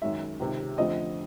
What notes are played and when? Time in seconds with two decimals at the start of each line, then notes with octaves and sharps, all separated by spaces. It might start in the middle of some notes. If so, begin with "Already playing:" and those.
0.02 F#2 D#3 G#3 E5
0.40 C#2 C3 D#3
0.78 F2 D3 F3 A3 C4 D#5